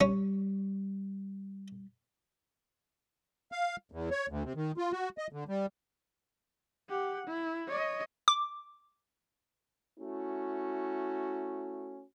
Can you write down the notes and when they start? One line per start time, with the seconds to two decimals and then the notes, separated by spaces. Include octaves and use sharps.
0.01 G3 C#4
3.52 F5
3.92 E2
4.11 C#5
4.29 D2
4.44 C3
4.56 D#3
4.77 F4
4.92 F#4
5.18 D#5
5.33 D3
5.48 G3
6.89 G4 F#5
7.27 E4
7.68 C#5 D#5
8.28 D6
9.99 A3 C#4 E4 F#4